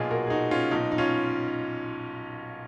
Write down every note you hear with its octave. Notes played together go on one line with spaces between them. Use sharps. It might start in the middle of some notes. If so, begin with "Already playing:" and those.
Already playing: B1 A#2 F4 G#4
F#4 A#4
G#4
D#4 F#4
C#4 F4
B1 A#2 D#4
D#4
C#4 F4